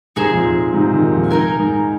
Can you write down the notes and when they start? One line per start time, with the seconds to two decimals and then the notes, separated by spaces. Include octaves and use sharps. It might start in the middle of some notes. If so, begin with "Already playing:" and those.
0.16 G#2 C3 D#4 G#4 C5 G#5
0.30 F2 A#2
0.45 F2
0.73 G#2 C3
0.93 A#2 D#3
1.12 F2 A#2
1.31 D#4 A#4 G#5
1.59 G#2